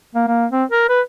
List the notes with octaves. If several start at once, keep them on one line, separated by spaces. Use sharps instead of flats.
A#3
A#3
C4
A#4
B4